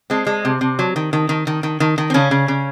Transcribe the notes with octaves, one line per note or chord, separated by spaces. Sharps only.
G#3 C4
G#3
C3
C3
F#3
D#3
D#3
D#3
D#3
D#3
D#3
D#3
C4
C#3 C#4
C#3
C#3